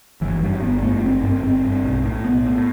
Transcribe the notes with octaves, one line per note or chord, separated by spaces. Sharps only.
G1 E3
G2 F#3
G1 B3
G2 A3
G1 C4
G2 C4
G1 C4
G2
B1
A2
B1 B3
A2